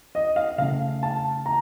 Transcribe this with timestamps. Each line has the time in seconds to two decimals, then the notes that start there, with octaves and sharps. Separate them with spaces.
0.15 D#5
0.36 F5
0.58 C#3 A3 F5
1.03 A5
1.46 A#5